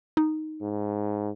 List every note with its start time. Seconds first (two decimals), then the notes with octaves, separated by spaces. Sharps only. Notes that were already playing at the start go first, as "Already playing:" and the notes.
0.17 D#4
0.62 G#2